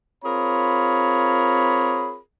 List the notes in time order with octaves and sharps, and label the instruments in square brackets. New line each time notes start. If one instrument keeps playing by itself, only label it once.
[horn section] C4 F4 G#4 A#4 C#5 B5